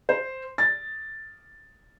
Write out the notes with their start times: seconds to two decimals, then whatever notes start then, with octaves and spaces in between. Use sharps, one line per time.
0.09 C5
0.58 A6